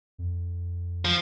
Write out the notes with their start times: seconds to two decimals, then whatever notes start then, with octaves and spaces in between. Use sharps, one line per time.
0.18 F2
1.05 F3